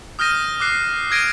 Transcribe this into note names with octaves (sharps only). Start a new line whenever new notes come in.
D#6 F6 G6 A#6 D#7
D6 F#6 C7
D#6 F6 G#6 A#6 D7 D#7